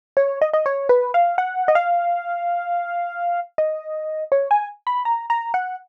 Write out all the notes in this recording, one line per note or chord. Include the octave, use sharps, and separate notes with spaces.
C#5
D#5
D#5
C#5
B4
F5
F#5
D#5
F5
D#5
C#5
G#5
B5
A#5
A#5
F#5